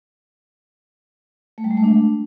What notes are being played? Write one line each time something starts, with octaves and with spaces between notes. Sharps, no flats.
A3
G3
G#3
A3
D4